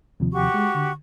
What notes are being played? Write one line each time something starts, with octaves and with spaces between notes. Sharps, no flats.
D#2 C3 F3
F#4 G4 C#6
G#3
D3